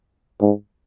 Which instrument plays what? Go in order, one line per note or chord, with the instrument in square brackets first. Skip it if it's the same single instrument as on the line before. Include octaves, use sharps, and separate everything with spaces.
[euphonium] G#2